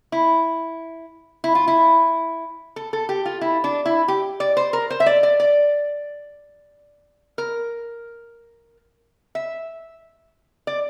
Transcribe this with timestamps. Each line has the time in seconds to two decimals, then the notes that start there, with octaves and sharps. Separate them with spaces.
0.12 E4
1.44 E4
1.55 F4
1.68 E4
2.76 A4
2.93 A4
3.09 G4
3.26 F4
3.41 E4
3.64 D4
3.86 E4
4.08 G4
4.40 D5
4.57 C5
4.73 A#4
4.90 C5
5.00 E5
5.06 D5
5.23 D5
5.40 D5
7.38 A#4
9.35 E5
10.67 D5